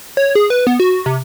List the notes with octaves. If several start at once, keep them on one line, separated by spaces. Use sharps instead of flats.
C#5
G#4
B4
B3
F#4
C3